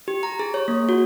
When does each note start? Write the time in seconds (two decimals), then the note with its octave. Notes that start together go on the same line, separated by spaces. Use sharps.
0.08 G4
0.23 A#5
0.39 G#4
0.54 C#5
0.68 A#3
0.89 F#4